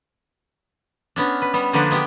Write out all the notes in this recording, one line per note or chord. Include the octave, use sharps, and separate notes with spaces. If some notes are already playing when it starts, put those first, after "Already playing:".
B3 C#4 D4
B4
G3 B3
D3 F3 A#3 D4 B4
G#3 B3 G4